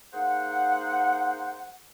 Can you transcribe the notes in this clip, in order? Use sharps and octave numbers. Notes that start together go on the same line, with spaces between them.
A#3 D#4 G#4 C5 F#5